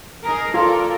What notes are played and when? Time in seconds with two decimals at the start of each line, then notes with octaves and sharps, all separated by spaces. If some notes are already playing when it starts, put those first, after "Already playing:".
0.24 D#4 G#4 A#4
0.54 F4 A4 A#4 D5